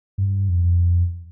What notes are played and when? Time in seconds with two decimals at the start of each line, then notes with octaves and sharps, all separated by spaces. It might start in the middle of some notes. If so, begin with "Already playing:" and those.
0.18 G2
0.49 F2